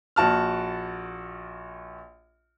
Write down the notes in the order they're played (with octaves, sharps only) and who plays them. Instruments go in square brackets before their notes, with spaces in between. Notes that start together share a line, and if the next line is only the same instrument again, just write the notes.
[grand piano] A#1 F#4 A5 F6